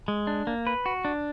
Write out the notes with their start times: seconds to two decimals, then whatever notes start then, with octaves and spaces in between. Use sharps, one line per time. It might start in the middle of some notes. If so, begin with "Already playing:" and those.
0.08 G#3
0.27 D4
0.47 A#3
0.67 B4
0.86 F#4
1.05 D4